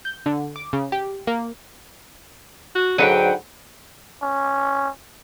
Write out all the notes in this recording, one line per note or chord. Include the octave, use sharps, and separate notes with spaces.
G6
D3
D6
C#3
G4
A#3
F#4
G#2 D3 F#3 B4 F#5 G5
C#4